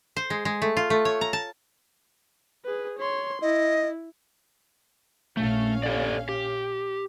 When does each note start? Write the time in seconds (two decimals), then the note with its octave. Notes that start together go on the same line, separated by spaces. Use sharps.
0.17 C5
0.30 G#3
0.45 G#3
0.62 A3
0.77 F4
0.90 A3
1.05 C#5
1.21 A#5
1.33 A5
2.65 G#4 B4
2.99 C#5 C6
3.42 E4 D#5
5.37 A#1 A3 C#4 F5
5.83 G4 A4 D5
6.29 G4